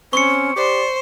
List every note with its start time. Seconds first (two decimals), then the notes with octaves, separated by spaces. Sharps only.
0.13 C4 C#4 C#6 C#7
0.56 G4 C5 D5